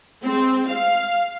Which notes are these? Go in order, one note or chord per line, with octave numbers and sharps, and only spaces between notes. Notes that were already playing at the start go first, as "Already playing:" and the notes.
G#3 C4
F5